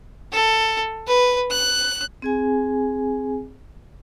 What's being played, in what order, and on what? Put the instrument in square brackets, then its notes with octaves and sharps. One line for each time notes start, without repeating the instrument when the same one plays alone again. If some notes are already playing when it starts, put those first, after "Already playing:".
[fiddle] A4
B4
F#6
[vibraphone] C4 G#4 G#5